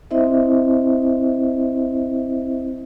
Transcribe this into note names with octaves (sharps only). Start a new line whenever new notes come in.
C4 E4 C5 D#5 E5